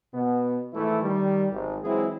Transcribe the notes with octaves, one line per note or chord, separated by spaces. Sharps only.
B2 B3
G#1 E3 A3 E4
D#3 G3
G#1
E3 F#3 G#3 C4 E4 G#4